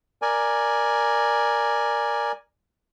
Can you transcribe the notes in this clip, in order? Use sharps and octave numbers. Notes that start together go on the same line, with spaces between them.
A#4 D5 G#5